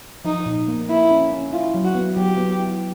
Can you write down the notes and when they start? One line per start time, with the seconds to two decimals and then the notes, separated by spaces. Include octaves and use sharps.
0.25 F3 D#4
0.46 A#2
0.68 A#3
0.89 A#3 E4
1.11 C#4
1.32 C#4
1.53 E4 F4
1.74 F#3
1.85 F#4
1.95 B3
2.16 F#3 G4
2.37 B3
2.60 E4